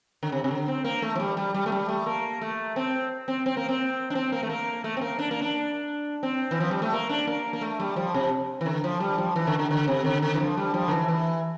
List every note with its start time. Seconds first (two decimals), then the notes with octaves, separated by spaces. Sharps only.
0.23 D3
0.32 C3
0.44 C3
0.51 D3
0.68 C4
0.84 A#3
1.02 A3
1.15 F3
1.20 G3
1.37 G3
1.54 G3
1.66 A3
1.72 G3
1.89 A3
2.06 A#3
2.41 A3
2.76 C4
3.28 C4
3.46 C4
3.57 A#3
3.69 C4
4.10 D4
4.15 C4
4.32 A#3
4.43 A3
4.50 A#3
4.84 A3
4.97 C4
5.01 A#3
5.19 D4
5.31 A#3
5.42 D4
6.23 C4
6.51 E3
6.60 F3
6.71 G3
6.82 A3
6.93 A#3
7.09 D4
7.27 A#3
7.53 A#3
7.61 A3
7.80 G3
7.96 F3
8.14 C3
8.61 E3
8.66 D3
8.84 F3
9.00 G3
9.18 F3
9.36 E3
9.47 D3
9.59 D3
9.71 D3
9.88 C3
10.04 D3
10.22 D3
10.35 E3
10.40 F3
10.57 G3
10.74 F3
10.88 D3
10.91 E3
11.08 E3